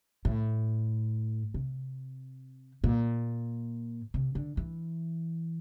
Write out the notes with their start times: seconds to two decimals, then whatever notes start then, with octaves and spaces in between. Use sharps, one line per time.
0.25 A2
1.54 C3
2.84 A#2
4.14 C3
4.35 D3
4.57 E3